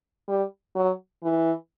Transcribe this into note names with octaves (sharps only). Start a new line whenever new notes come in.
G3
F#3
E3